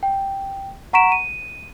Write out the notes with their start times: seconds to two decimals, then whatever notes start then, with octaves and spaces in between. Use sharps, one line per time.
0.03 G5
0.93 F#5 A#5 C#6 B6 D7 E7
1.12 D#7